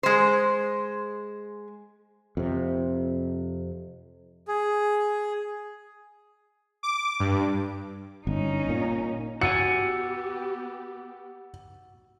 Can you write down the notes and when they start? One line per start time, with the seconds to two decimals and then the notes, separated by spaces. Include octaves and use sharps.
0.03 G#3 C5
2.37 F2 C3
4.48 G#4
6.83 D6
7.20 G2
8.27 G1 C#4 D#4
8.69 A#2
9.42 B3 F#4 G4 F#5 G#5 E6 A6 C#7